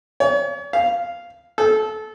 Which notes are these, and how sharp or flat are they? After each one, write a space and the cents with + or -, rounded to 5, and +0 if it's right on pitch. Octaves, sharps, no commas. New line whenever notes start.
C#5 +40
F5 -5
A4 -25